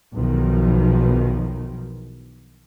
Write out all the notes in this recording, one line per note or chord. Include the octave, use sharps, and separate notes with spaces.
B1 E2 B2 D#3 F3